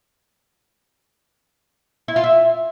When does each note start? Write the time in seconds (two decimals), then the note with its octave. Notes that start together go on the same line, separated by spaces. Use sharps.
2.08 E4
2.16 F4
2.24 E5